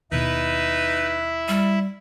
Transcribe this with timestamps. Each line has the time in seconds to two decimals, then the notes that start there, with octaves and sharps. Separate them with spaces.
0.12 D#2 B2 D#4 E4 B4 E5
1.48 G3